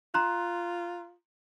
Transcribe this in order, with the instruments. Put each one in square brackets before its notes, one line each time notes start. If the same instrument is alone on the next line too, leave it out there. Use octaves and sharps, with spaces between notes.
[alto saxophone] F4 [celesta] A#5 C6 F#6